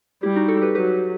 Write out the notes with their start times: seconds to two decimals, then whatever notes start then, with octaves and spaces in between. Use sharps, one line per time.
0.23 G3 E4 G4
0.36 D#4 F#4
0.48 F#4 A4
0.62 G4 B4
0.75 F#3 G4 B4